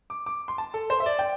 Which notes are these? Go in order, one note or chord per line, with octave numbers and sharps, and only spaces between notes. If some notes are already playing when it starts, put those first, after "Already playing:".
D6
D6
C6
A5
A4
C5
E5
D5
G5